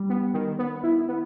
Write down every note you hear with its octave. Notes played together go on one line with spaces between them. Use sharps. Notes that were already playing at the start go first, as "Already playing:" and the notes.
Already playing: G3
B3
D#3
B3
E4
B3